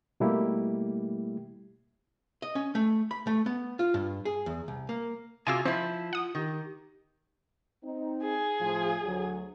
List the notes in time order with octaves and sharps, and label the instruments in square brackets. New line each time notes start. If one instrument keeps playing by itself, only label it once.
[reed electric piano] B2 G3 A3 A#3 E4 G4
[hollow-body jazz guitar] D#5
C#4
A3
B5
A3
B3
F4
G2
G#4
E2
C2
A#3
[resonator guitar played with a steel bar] C3 F4 G#4 [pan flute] F#4 [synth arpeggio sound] G#5 D6 E6
[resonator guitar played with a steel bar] F3 E4 [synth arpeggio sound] C4 [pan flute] F4
[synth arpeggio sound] F#5 D#6
[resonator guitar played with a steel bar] D#3 [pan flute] G4
[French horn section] C4 D#4
[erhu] G#4
[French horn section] A2 F3
D2 F#3